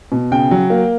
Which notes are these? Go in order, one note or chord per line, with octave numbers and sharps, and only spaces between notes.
B2
C#3 G5
F#3
A#3